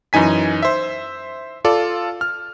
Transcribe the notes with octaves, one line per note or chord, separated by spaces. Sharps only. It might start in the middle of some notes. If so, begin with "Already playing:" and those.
F#2 E3 D#4 G#5 B6
C5 E5
F4 A4 D5
F6